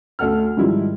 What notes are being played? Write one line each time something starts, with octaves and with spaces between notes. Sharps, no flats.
D2 A4 F#5 F6
G#2 D#3 F3 G3 E4